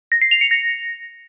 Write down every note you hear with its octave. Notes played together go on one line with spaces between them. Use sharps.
A#6
C7
F7
C#7
A#6